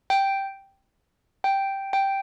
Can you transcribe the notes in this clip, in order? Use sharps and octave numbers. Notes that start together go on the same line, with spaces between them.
G5
G5
G5